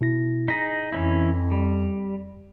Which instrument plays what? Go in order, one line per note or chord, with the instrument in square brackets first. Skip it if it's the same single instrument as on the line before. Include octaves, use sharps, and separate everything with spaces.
[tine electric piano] B2 E4 A#6
[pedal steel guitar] D#4 G#4 [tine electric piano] A#6 B6
[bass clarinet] F2 [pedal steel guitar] E3 C#4 E4
[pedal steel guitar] G3